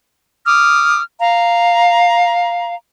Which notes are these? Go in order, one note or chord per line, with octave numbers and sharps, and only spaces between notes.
D6 D#6 F6
F5 A#5